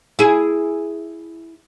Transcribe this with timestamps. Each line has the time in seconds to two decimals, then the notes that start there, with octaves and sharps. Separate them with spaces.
0.19 E4 G#4